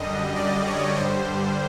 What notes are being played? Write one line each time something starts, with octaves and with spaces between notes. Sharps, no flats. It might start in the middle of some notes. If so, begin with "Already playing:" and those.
Already playing: F#2 D3 G3 D#5
D5
C#5
G2 D3 G3 C5